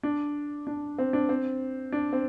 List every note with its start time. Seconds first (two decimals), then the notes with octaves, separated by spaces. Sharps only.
0.03 D4
0.67 D4
0.98 C4
1.13 D4
1.29 C4
1.92 D4
2.13 C4